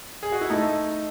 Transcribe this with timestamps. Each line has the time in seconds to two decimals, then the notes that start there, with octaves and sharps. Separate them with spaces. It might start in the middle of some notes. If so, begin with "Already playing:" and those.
0.23 G#4
0.32 F#4
0.41 E4
0.50 A3 D#4